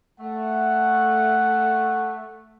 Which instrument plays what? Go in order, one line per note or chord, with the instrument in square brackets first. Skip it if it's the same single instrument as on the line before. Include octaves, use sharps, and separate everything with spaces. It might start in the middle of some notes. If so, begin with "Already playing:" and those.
[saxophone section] A3 [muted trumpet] F#5